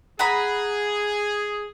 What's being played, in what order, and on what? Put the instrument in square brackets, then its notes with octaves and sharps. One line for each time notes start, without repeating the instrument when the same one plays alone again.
[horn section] G#4 [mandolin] F#5 A#5 B5